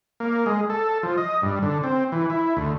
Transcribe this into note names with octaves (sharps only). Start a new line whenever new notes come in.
A#3
G#3
A4
F3
D#5
G2
D3
C4
E3
E4
D2